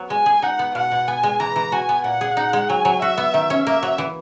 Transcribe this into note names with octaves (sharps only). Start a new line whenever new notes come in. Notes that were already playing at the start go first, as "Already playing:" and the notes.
Already playing: F#3 B3
G#3 G#5
G#4
D#4 F#5
B3
B2 F#5
B2
B3 G#5
G#3
E3 A#5
E3
F#4 G#5
B3
A#2 F#5
G#4
D#4
G#3
F#3 G#5
F#3
F#4 E5
B3
D#3
C#4
A#3 E5
F#3
E3